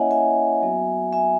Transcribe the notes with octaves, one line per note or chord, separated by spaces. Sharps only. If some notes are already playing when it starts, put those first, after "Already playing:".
Already playing: A#3 C#4 E4 C#5 D#5 E5 F#5 G#5
E5 G#5
F#3 B3 F#4
E5 G#5